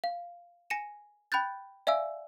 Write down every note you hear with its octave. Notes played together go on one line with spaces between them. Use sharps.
F5
G#5 A#6 C#7 D#7 E7
G5 B5 F#6 G6 A6
D5 E5 F5 G#5 E6